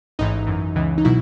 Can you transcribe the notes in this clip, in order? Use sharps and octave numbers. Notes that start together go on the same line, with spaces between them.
A1 G#2 E3 D#4
F#2 E3
C#2 C#3 E3
D#4
B2 F#3 E4